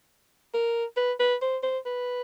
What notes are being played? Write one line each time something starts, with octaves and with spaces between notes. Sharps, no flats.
A#4
B4
B4
C5
C5
B4